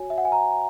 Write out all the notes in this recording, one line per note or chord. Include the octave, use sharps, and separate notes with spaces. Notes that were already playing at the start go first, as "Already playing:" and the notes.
Already playing: F#4 C#5 G#5
E5
F#5
G#5
A#5